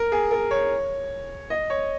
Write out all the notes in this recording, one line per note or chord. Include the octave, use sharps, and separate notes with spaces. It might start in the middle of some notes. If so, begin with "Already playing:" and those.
Already playing: A#4
G#4
A#4
C#5
D#5
C#5